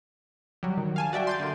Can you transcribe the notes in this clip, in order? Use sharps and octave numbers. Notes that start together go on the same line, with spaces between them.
F#3 G3
D#3
F5 G#5 A5
F#4 D5 E5 G5
C6 G6 A6
D3 A#3